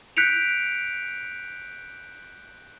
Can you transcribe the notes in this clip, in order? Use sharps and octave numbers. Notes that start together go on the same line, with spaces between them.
F#6 G6 B6 C#7 D7 F7